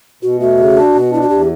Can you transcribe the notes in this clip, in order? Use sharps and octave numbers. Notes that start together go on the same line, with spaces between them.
B2 F#4
A3 F#4
C#3
D4
B2
D4 E4
F#4
E2 G4